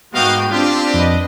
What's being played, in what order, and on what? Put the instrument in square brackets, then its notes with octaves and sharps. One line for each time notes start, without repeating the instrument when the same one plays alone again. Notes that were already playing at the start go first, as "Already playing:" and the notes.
[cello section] G#2 [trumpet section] A#3 D#5 F5 [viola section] B3 F#4 G5
[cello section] C4 D4 [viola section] F4 [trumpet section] G4
[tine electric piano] F2 [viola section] B4 D#5